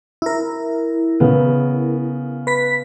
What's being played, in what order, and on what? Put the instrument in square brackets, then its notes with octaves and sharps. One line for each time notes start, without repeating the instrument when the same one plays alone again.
[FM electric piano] E4 A#4
[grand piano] C#3 B3
[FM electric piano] B4 B6